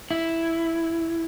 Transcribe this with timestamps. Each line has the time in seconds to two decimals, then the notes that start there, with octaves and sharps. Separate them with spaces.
0.11 E4